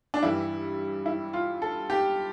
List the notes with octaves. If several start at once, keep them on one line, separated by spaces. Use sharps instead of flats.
D4
G2 E3 G3 E4
E4
F4
A4
G4